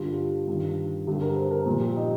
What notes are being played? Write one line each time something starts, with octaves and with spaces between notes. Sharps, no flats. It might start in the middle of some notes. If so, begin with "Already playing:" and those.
Already playing: G2 D3 G3 F4
G2 D#3 G3
G2 D3 G3 G4
A#4
C5
A#4
A#2 F3
G4
D#4